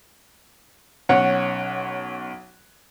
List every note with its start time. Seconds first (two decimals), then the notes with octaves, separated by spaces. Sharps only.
1.09 B1 C#4 C#5 F#5